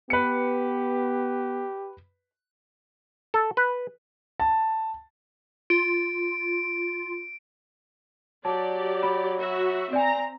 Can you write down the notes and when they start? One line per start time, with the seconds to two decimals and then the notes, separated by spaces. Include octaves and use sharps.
0.10 B3 G4 B4 C#7
3.34 A4
3.57 B4
4.40 A5
5.70 F4 D7
8.45 F#3 G4 D5 A5
9.03 B5
9.38 F#4 E5
9.93 C4 D5 G#5 A#5